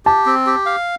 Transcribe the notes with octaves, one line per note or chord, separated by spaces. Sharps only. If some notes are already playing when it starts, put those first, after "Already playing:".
G4 A5
C4
G4
F5